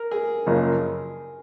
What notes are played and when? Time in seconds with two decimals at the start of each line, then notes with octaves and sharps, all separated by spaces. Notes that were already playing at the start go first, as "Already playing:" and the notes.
Already playing: A#4
0.11 G#4
0.46 F#1 F#2 C#3 F3 A#3